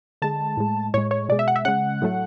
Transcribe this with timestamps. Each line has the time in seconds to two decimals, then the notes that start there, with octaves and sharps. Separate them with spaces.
0.22 D3 G#3 A5
0.57 A2 G#3
0.94 A2 G#3 C#5
1.11 C#5
1.29 B2 G#3 D5
1.39 E5
1.48 F#5
1.56 E5
1.65 C#3 G#3 F#5
2.02 A2 F#3 A3